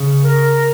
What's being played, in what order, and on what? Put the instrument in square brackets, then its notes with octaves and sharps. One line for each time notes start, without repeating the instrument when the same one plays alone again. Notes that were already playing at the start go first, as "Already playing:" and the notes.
Already playing: [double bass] C#3
[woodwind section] A#4